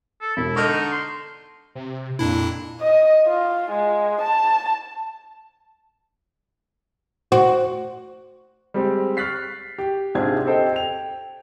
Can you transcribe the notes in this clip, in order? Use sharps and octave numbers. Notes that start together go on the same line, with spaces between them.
A4
E1 E4
D3 D#5 C#6 F6 G6
D#4
C6
C3
F2 A#2 D4 E4
D#5
F4
G#3
A5
F#4 C5
G3 G#3 C4 G4
C#6 F6 F#6 A6 B6 C7
G4
G#2 C3 D4 F4 G#4 G#6
C4 G4 A4 C5 D#5 G5
G5 F7